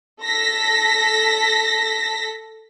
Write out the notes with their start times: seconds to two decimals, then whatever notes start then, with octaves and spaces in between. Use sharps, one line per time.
0.23 A4 A#6 B6